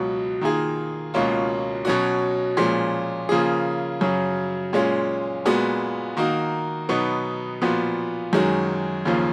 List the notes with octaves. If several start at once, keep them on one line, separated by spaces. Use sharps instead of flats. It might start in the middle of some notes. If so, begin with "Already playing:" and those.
Already playing: C#2 B2 F#3
D#3 A#3 F4 G#4
C#2 B2 A#3 C#4 F4
B2 F#3 C#4 F#4
A#2 F3 G#3 C#4
C#3 F3 A#3 F4 G#4
F#2 C#3 F#3
A#2 G#3 C#4 F4
A#2 G#3 B3 F#4
D#3 A#3 D#4 F#4
B2 F#3 B3 D#4
A#2 F3 B3 F#4
F#2 D#3 G#3 C#4 F#4
D#2 C#3 F3 A#3 F4